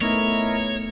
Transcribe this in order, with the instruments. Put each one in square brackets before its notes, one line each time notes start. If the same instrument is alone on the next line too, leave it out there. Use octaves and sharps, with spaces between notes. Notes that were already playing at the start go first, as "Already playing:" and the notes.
[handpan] A3 B3 D#4 [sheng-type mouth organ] E4 A#4 D#5 [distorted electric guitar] C#5